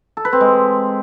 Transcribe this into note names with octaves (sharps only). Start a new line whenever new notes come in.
A4
B4
C4
G#3